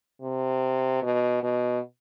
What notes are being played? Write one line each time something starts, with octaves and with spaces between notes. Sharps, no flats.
C3
B2
B2